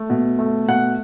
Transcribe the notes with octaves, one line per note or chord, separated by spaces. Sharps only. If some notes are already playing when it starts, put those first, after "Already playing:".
Already playing: A3
B2
A3
B2 F#5